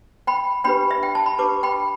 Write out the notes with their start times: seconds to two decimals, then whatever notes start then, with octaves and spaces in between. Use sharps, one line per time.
0.27 G5 B5
0.64 D4 G4 B4 G5 B5
0.91 E5
1.03 G5
1.15 A5
1.26 B5
1.38 D4 G4 B4 A5 D6
1.63 G5 B5